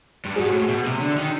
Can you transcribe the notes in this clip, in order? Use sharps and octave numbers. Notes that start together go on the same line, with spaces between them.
G2
G#2 F#4 G#4
A2
B2
C3
D3
D#3